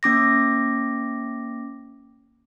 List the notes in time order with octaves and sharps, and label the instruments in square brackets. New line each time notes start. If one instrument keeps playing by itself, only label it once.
[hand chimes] A#3 C#4 D6 A#6